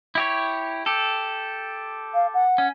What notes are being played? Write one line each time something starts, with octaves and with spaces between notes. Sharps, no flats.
E4 G4 C#5
G4 A4
F5
F#5
C#4